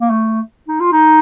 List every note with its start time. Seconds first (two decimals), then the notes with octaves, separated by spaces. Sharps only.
0.01 A#3
0.10 A3
0.68 D#4
0.81 F4
0.93 D#4